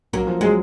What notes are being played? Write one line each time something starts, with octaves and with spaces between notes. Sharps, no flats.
F#3 A#3
F3
F#3 G#3